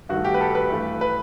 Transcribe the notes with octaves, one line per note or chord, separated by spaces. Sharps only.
G2 D#3 A3 F#4
G4
B4
A4
B4
G2 E3 A3
B4